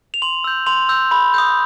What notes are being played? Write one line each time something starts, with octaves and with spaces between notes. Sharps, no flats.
F7
C6 F#7
E6 G6
C6 F7
E6 G6
B5
D#6 G6